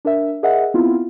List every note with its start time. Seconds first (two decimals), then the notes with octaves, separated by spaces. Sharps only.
0.05 D4 A#4 E5
0.43 G#4 A#4 D#5 E5 F#5
0.74 B3 C4 E4 F4